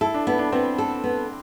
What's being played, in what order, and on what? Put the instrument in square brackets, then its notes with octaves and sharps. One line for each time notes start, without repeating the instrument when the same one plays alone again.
[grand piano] E4 [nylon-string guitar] A4
[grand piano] D4
[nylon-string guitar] B3 [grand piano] E4
[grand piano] D4
[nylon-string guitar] B3 [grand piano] C4
[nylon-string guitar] A4
B3